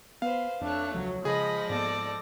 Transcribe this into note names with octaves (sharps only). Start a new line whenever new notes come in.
B3 B4 C5 F5
F2 A3 D4 C#5 F#6
E1 C#2 F3 F#3
C#3 F3 G#3 G#4 D#5 B5 A#6
G#2 A#3 B3 A4 D5